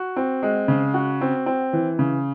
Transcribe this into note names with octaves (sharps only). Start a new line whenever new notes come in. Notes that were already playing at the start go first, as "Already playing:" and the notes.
Already playing: F#4
C4
G#3
C#3
F#4
C4
C4
E3
C#3